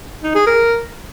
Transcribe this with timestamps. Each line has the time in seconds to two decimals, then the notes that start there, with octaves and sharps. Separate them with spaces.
0.23 D#4
0.35 G#4
0.47 A#4